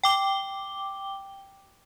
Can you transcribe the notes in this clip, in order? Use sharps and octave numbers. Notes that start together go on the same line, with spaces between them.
G5 D6 G7